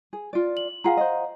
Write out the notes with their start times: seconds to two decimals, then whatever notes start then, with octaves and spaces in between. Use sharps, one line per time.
0.13 G#4
0.33 F4 D5
0.57 F#7
0.84 F4 G#4 F5 F#5 A#5
0.97 C5 D#5